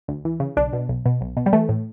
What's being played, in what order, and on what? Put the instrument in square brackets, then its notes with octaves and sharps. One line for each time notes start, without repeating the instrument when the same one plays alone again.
[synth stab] D2
E3
C#3
B1 D4
B2
B1
B2
B1
B2
G3
E3 A3
A2